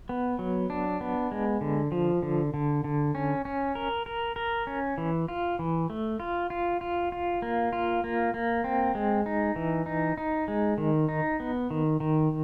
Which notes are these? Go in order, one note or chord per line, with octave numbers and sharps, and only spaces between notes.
B3
F#3
D4
B3
G#3
D3
F3
D3
D3
D3
C#4
C#4
A#4
A#4
A#4
C#4
E3
F4
E3
A3
F4
F4
F4
F4
A#3
F4
A#3
A#3
C4
G#3
D#4
E3
D#4
D#4
G#3
D#3
D#4
B3
D#3
D#3